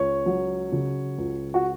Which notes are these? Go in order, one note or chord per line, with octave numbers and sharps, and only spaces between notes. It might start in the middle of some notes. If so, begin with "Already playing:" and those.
Already playing: C#2 C#5
F#3
C#3
C#2
F#4